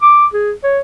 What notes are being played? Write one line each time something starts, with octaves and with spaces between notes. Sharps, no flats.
D6
G#4
C#5